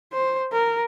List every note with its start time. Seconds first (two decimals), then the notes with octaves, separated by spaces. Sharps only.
0.13 C5
0.53 A#4